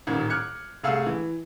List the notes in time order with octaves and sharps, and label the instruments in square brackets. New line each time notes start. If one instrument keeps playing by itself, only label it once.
[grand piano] D#1 A1 D#3 C#4 G#6
D6 F6 F#6 G#6 C#7
C2 A3 G#4 F5 E6
E3